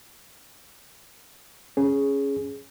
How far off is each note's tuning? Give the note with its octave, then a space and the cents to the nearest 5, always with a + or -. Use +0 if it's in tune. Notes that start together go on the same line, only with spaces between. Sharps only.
C#4 +0 G#4 +0